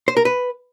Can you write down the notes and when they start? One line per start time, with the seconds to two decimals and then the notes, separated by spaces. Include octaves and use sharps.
0.08 C5
0.17 A#4
0.25 B4